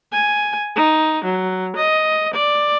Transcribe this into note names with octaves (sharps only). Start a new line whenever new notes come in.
G#5
D#4
F#3
D#5
D5